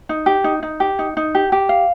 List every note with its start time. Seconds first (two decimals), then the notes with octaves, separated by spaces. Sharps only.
0.09 D#4
0.26 G4
0.44 D#4
0.63 D#4
0.80 G4
0.99 D#4
1.17 D#4
1.35 G4
1.52 G4
1.69 F5